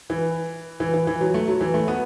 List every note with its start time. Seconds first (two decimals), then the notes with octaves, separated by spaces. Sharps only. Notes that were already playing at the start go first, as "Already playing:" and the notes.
0.10 E3
0.80 E3
0.93 E3
1.07 E3
1.21 F#3
1.34 A3
1.48 F#3
1.61 E3
1.74 A3
1.88 B3